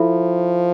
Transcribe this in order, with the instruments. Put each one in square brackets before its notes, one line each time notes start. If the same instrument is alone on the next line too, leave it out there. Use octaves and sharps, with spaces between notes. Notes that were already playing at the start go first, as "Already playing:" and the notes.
Already playing: [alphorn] F3 [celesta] E4 A4 E5 B5